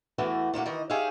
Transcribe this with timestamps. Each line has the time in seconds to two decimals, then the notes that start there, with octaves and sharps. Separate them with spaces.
0.18 E2 E3 A3 F#4
0.53 A#2 A3 A#3 F#4
0.66 D#3 E3 D#5
0.90 D#4 G4 G#4 C#5 E5 F5